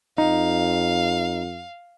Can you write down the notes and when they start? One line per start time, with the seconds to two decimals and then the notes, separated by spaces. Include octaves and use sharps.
0.18 F2 D#4 F5